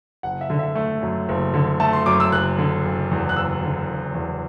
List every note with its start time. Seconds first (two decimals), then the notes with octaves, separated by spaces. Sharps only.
0.23 F#1 F#5
0.41 E5
0.50 D3
0.59 E5
0.75 A3
1.02 F#2
1.29 F#1
1.54 D3
1.80 A3 A5
1.93 C6
2.06 F#2 D6
2.20 E6
2.32 F#1 F#6
2.58 D3
2.85 F#1
3.11 E2
3.29 F#6
3.36 F#1 E6
3.62 D3
3.89 F#1
4.15 E2